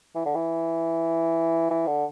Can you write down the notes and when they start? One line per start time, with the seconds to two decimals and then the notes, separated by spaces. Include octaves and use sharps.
0.15 E3
0.25 D3
0.35 E3
1.71 E3
1.87 D3